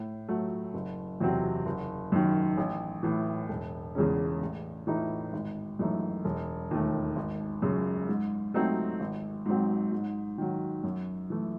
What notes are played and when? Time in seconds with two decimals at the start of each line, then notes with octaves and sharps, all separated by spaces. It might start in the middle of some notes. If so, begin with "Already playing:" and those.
Already playing: A2
0.29 F#3 A3
0.74 F#1
1.20 E2 C3 F#3 C4
1.66 F#1
2.12 F#2 D#3
2.58 A1
3.03 A2 E3
3.49 E1
3.95 E2 C#3 G#3 C#4
4.41 A1
4.87 A2 E3 A3 D#4
5.33 G#1
5.79 F#2 E3 A3 D#4
6.25 E1
6.71 D#2 D#3 A3
7.16 G#1
7.62 F#2 C#3
8.08 G#2
8.54 F#3 A3 C4 D#4
9.00 G#1
9.46 G#2 F#3 C4
9.92 G#2
10.38 D#3 F#3
10.83 F#2
11.30 E3 A3